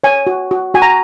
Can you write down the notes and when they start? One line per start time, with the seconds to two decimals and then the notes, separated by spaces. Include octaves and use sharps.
0.04 C#5 G#5
0.27 F#4
0.51 F#4
0.74 F#4 G#5
0.82 A#5